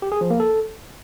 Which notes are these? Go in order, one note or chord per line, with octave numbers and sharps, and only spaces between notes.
G4
G#4
F3
A#3
A4